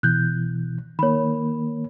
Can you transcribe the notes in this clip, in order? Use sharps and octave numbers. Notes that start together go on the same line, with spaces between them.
B2 E3 F#6 G6
D#3 A#3 C#5 B5